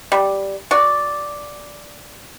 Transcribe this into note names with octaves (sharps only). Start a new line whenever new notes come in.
G3
F#4 D5